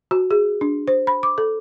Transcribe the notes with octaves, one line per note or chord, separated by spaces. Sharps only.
F#4
G#4
D4
C5
B5
D6
A4